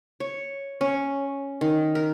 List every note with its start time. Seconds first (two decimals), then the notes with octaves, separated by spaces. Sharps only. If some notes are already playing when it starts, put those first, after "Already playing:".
0.20 C#5
0.81 C#4
1.61 D#3
1.95 A#4